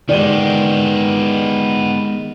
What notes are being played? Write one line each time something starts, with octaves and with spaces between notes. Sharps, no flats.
D#3 G#3 B3 G4 D5 D#7 G7